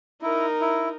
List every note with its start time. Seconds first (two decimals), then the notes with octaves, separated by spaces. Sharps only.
0.22 D#4 E4 A#4
0.61 E4